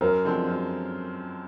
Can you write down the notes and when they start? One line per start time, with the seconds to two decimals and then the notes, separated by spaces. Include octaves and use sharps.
0.01 F#2 A#4
0.24 D3 F3 G#3 C4
0.48 F#2